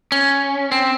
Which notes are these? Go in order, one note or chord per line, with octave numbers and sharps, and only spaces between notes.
C#4
C4